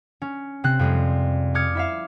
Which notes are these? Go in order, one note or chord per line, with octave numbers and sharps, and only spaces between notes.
C#4
C3 C4 F#6
F2 G3 G#3
D6 D#6 F6 G#6 C#7
E4 E5 F5